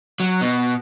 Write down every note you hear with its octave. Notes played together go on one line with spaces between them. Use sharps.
F#3
B2